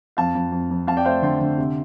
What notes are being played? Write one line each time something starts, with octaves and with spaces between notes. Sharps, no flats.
F2 F5 A5
F2
F2
F2
F2 F5 A5
D5 G5
A3 C5 F5
D3 G5 C6
D3
C3